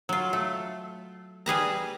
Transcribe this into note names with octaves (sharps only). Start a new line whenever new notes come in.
F#3 F4
A3
G3 G#4 B4 A#5